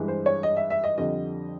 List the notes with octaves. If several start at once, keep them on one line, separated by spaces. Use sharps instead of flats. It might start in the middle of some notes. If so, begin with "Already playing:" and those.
Already playing: G2 E3 G#3
C5
C#5
D#5
E5
E5
D#5
F2 D3 G3 D#5